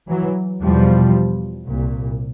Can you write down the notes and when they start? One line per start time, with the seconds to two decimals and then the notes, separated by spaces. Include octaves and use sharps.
0.09 E3 F#3
0.62 E2 B2 F3 G3
1.67 C2 A#2